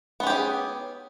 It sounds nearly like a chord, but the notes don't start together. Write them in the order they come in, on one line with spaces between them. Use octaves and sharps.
B3 C#4 G4 G#4